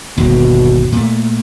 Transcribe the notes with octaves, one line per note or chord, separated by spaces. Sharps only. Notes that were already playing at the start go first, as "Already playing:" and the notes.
G1 D#2 B2
A#2 A3